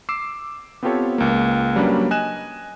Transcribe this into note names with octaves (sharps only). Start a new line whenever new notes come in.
D6 E6 C7 E7
B3 C4 F4 G4 A4 C#5
C#2 A#3
F#3 G3 A#3 C#4 D4 B4
D#5 G#5 F#6 E7